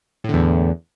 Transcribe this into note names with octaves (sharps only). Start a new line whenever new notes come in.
E2 A2 D3